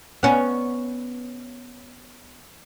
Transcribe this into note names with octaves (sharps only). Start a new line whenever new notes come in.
B3 C#4